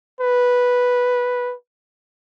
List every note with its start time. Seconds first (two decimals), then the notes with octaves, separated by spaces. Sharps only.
0.21 B4